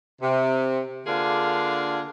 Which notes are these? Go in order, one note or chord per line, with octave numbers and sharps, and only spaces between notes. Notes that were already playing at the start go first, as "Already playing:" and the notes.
C3
D3 A#3 D4 F4 G#4